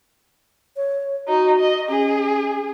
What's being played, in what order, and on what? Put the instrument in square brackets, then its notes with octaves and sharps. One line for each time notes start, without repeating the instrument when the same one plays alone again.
[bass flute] C#5
[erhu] D#4 [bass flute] F#4
[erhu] D#5
[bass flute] C#4 [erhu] G#4